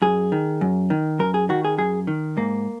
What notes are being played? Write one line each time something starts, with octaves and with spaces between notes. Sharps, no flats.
F#2 G#4
D#3
F#2
D#3
F#2 A#4
G#4
D#3 F#4
G#4
F#2 G#4
D#3
G#2 A#3